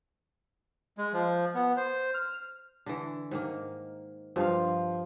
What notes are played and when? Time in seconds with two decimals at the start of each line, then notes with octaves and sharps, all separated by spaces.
0.98 G#3
1.13 F3
1.55 B3
1.77 C5
2.14 F6
2.86 D3 E3
3.31 G#2 D#3 A#3
4.36 G2 F3 D#4 F5